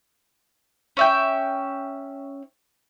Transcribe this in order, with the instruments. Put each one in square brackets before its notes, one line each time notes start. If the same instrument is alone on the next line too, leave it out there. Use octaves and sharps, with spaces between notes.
[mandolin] C#4 E5 G5